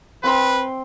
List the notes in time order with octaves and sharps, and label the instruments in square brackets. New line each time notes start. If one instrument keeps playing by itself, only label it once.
[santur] C4 G5 C6 [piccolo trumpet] B4